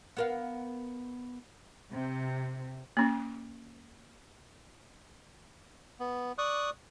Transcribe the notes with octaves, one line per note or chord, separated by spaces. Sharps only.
B3 A#4 F5
C3
A#3 C#4
B3
D5 C#6 D#6 F#6